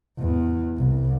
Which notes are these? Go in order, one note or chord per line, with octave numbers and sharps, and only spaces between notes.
E2
C2